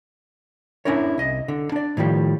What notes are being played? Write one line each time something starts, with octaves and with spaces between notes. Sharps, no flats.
C#4 D4 E4 A#4 C#5
C2 D#5
D3
D4 D5
A2 D#3 F3 G3